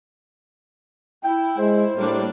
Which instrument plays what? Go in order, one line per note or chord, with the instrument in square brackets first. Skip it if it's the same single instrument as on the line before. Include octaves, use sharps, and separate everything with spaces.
[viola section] E4 [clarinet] G5
[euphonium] G#3 [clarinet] C5
[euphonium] A2 [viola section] G3 A#3 D4